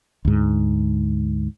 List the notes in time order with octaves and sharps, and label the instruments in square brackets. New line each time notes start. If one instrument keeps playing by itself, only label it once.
[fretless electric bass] D2 G#2